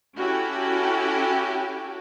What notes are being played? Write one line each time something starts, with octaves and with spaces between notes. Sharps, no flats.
C#4 E4 F#4 G4 A4